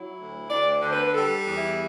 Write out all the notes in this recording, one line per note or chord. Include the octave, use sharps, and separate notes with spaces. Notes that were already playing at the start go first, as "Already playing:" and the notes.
Already playing: F#3 E4
D2
D2 D5
D5
D3 C5
B4
G3 A4
E2
E4